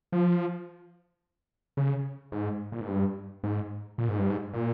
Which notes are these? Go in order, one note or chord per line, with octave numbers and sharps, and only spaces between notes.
F3
C#3
G#2
A#2
G#2
G2
G#2
A#2
G#2
G2
G#2
A#2